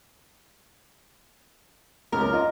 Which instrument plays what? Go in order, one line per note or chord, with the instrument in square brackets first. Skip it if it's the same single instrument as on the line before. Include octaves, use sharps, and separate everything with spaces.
[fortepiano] C#2 [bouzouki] A#4
[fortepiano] F4 D#5